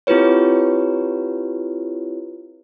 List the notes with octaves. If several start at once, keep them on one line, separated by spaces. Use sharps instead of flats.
C4 E4 F4 G4 B4 C#5